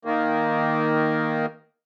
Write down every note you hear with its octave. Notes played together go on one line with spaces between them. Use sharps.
D#3 A#3